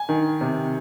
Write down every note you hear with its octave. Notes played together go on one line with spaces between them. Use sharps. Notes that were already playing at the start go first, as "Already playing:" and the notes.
Already playing: G#5
D#3
C3